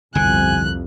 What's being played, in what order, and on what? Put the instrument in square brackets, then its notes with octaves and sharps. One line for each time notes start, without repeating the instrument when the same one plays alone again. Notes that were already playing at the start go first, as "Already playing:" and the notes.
[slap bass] G1 C3 [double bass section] C2 F2 [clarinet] G#5 [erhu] F#6